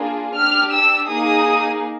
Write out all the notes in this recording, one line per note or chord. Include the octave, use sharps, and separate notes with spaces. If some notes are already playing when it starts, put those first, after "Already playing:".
Already playing: A#3 D4 F4 G#4
D4 G4 F6
E6
A#3 D#4 G#4 D#6